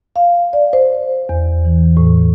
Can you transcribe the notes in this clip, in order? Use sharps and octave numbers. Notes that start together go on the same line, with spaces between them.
F5
D5
C5
E2
E3
A2